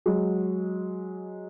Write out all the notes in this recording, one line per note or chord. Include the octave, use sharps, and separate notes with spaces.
F#3 G#3